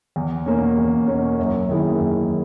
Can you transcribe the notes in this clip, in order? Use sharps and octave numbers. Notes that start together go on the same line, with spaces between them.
E2
B2 A#3 C#4
E2
B2 A#3 C#4
F#2
D#3 A#3 E4 G#4
F#2